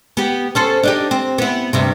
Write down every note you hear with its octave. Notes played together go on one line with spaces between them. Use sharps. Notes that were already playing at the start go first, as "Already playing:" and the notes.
B3 G4
C#4 A4 C5
D4 D#4 G4
C4
B3 E4
D2 G2 C3